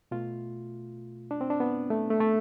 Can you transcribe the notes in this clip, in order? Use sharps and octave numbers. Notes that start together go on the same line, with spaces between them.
B2 A3 F4
D4
C4
D4
B3
A3
A3
A3